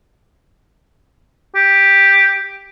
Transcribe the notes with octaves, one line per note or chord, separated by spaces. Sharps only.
G4